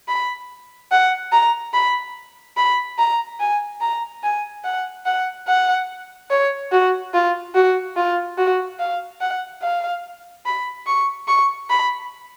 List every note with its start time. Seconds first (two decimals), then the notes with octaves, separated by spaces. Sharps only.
0.08 B5
0.91 F#5
1.33 A#5
1.74 B5
2.57 B5
2.99 A#5
3.40 G#5
3.81 A#5
4.23 G#5
4.64 F#5
5.06 F#5
5.48 F#5
6.31 C#5
6.72 F#4
7.14 F4
7.55 F#4
7.97 F4
8.38 F#4
8.80 F5
9.21 F#5
9.62 F5
10.46 B5
10.87 C#6
11.28 C#6
11.70 B5